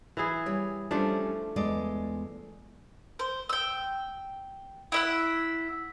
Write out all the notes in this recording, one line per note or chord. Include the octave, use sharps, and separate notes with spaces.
E3 E4 G#4
G3 C#5
F3 G3 A3 C#4 D4 C5
E2 G#3 D5
C5
G5 E6
E4 E5 F#5